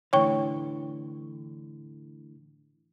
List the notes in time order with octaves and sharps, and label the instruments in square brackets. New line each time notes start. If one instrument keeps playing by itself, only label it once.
[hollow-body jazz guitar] A2 D3 E3 [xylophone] C#5 G5 C#6